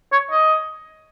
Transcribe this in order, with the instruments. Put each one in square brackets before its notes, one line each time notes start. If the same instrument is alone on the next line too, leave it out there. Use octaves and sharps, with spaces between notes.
[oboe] C#5
D#5